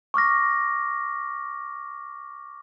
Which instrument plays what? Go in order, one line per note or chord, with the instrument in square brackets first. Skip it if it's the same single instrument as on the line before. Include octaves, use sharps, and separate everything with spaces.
[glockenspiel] C#6 D6 F6 A#6